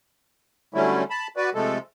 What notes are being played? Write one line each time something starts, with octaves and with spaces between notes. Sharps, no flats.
D3 F#3 G3 A3 C#4 E4
A5 B5
F#4 B4 D5
C3 F3 G#3 A3 A4